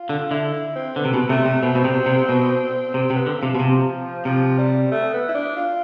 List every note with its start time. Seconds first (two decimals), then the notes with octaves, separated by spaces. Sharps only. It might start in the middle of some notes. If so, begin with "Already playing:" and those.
Already playing: F4
0.09 D3
0.31 D3 E4
0.54 E4
0.75 C4
0.96 D3 B3
1.05 C3
1.14 B2
1.29 C3 A3
1.45 C3
1.63 B2 C4
1.75 B2
1.85 C3
2.06 C3
2.29 B2
2.94 C3 C4
3.10 C3
3.16 B3
3.26 D3
3.38 C3 F3
3.55 B2
3.59 C3
4.25 C3 F3
4.58 G3
4.91 A3
5.14 B3
5.28 E4
5.35 D4
5.57 F4